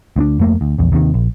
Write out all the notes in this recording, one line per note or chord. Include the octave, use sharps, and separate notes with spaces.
D2 C4 D4
F2 A3 A#3
D2
A#1 E2
D#2 C3 D#3
A#1